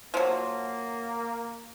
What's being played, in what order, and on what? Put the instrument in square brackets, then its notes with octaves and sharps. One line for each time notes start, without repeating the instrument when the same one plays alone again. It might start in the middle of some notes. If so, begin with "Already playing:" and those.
[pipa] F3 F#3 [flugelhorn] A#3